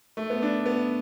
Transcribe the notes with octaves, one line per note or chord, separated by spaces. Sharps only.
A3
B3
D4
B3